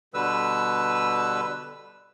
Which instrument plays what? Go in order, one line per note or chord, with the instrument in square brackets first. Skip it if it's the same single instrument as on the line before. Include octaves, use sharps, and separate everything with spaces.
[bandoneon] B2 D3 G3 B4 E6